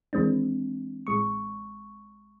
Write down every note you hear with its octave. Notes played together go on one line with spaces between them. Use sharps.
D#2 E3 G#3 C4 D4
A1 G#3 C#6